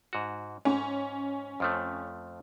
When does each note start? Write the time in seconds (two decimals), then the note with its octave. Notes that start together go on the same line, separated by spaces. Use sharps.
0.13 G#2 F#4
0.65 G#2 C#4
1.60 F2 F3 A3